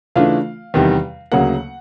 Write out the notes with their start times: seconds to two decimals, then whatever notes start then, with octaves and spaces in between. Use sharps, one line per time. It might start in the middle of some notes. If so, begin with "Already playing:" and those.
0.16 C#3 E3 A3 D4 F4 F5
0.74 E2 C3 D#3 G3
1.32 D2 C#3 F#3 A#3 F#5